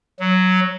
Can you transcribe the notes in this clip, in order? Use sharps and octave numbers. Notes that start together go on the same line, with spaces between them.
F#3